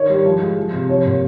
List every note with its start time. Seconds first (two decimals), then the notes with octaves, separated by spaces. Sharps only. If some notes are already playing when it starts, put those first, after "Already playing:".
Already playing: D#3 C#5
0.09 G3
0.25 F3
0.41 G#3
0.58 F3
0.73 C3
0.88 F3 C#5
1.05 A#2